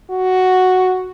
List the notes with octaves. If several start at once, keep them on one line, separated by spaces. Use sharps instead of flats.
F#4